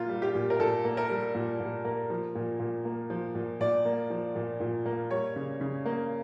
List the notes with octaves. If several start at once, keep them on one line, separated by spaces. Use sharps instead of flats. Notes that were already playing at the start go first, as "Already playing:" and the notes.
Already playing: A#2 A#3 F4
G3
G4
A#2
A#4
A#2 A4
A#3
A#4
G3
A#2
A#2
A#3
F3
A#2
A#2
A#3
F3
A#2
A#2 D5
A#3
F3
A#2
A#2
A#3
G3 C#5
C#3
C#3
A#3